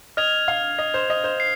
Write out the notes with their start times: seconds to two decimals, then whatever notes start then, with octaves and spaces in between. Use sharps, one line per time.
0.17 D#5 F6 G#6 F7
0.48 F5
0.79 D#5
0.94 C5
1.10 D#5
1.24 C5
1.40 C7